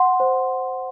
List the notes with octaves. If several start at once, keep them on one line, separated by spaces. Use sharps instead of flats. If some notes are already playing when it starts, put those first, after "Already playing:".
Already playing: F#5 C6
C5